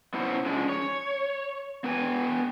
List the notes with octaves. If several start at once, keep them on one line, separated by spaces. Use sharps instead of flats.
B3 C#4 E4 C5 F#5 A5
F3 G#3 C#4 D4
C#5
B3 D4 B4 G5 G#5